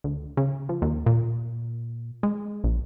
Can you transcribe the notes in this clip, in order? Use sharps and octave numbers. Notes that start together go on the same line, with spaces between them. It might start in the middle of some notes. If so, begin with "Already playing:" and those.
D2
C#3
F3
D#2
A#2
G#3
A#1